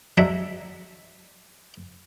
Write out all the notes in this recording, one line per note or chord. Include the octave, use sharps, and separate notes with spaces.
F#3 G#3 D4 E5